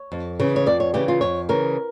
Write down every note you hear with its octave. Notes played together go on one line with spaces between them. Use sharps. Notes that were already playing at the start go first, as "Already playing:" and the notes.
Already playing: C#5
F2
C#3 E3
C#5
F2 D5
C#5
C#3 E3 G4
F4
F2 C#5
C#3 E3 A#4